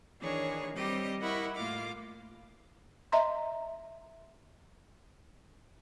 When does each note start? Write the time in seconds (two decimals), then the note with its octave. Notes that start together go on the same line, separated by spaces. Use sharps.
0.20 D#3 E3 D4 G#4 C#5 A#5
0.74 G3 C4 G4 D#5
1.20 E4 A#4 D#5 F#5 B5 C#6
1.54 A2 A#3 F4 D6 F6
3.12 D#5 E5 A#5 C6